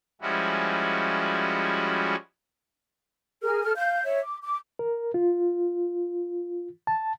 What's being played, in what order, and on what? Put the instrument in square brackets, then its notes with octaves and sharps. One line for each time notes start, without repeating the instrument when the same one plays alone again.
[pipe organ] F3 G3 G#3 C#4 E4 F#4
[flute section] G#4 A#4 F6
A4 F6
F5 G6
C#5 E5
D6
D6
[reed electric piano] A#4
F4
A5